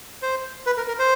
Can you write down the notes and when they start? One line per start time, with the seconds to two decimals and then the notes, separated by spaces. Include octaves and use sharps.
0.22 C5
0.66 B4
0.77 A#4
0.88 A#4
0.99 C5